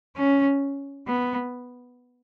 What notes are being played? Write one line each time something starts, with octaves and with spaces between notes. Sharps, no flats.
C#4
B3